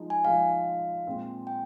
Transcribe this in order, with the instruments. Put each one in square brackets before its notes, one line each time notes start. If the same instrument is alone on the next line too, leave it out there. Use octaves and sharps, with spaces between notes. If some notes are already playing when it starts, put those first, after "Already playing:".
Already playing: [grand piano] F3 G#3 D#4 D#5
[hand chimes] G#5
[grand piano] F3 G#3 D#4 G#4 D#5 [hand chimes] F5
[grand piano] A#2 G#3 C4
[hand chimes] G5